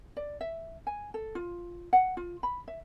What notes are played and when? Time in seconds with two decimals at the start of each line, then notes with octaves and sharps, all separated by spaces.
0.17 D5
0.41 E5
0.87 G#5
1.14 A4
1.35 F4
1.93 F#5
2.17 F4
2.43 B5
2.68 E5